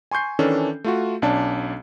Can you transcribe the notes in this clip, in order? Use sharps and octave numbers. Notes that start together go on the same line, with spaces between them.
G#5 C6 C#6 G6 C7
D#3 E3 C#4 D4 A4
A3 F4 F#4
B1 C#4 D4 D5 A5